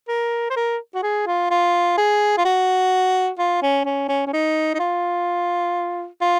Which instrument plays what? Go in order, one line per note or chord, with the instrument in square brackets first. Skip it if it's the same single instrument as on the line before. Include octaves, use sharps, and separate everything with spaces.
[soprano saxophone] A#4
C5
A#4
F#4
G#4
F4
F4
G#4
F4
F#4
F4
C#4
C#4
C#4
C#4
D#4
D#4
F4
F4